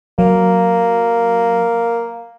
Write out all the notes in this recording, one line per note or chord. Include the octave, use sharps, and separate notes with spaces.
F#3 A#3